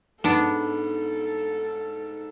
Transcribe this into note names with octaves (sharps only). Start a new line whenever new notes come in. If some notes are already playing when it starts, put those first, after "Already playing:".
G#2 B3 D4 A4